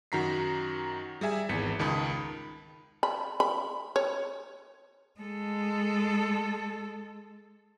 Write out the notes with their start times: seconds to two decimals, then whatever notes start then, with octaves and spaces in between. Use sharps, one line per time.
0.12 F#2 D#3 F#4 A#5 B6 C7
1.21 G3 G#4 E5 G#5
1.49 G#1 E2 B6 C#7
1.79 C#2 D#3 A5 B5 D#6
3.03 B5
3.40 B5
3.96 C#5
5.20 G#3 A4